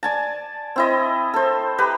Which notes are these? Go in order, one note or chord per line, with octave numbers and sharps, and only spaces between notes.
D5 G#5 A5
C4 E4 D#5
A4 C5
G4 B4 A#5